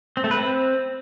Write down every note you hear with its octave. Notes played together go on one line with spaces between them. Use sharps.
C4
A3
B4
C4